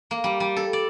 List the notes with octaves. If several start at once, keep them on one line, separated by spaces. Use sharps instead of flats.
A#3
G3
G3
A4
D5